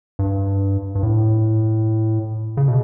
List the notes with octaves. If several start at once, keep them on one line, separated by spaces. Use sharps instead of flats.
G2
G2
A2
C#3
B2